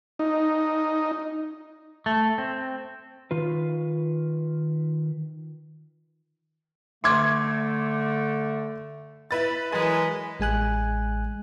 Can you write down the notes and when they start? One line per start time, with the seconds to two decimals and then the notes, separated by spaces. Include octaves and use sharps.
0.19 D#4
2.06 A3
2.38 C4
3.31 D#3 F4 B4
7.04 D3 A3 C6 D6 G#6
9.31 E4 B4 B5 A6
9.72 E3 F#3 G#3 A#4 B4 G#5
10.40 A1 G#3 G#5 F#6